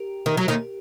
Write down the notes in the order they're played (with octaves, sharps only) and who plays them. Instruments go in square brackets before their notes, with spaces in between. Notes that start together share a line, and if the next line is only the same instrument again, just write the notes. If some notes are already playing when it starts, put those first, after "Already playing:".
Already playing: [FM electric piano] G4 A#4
[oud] D#3
F#3
D#2 D#3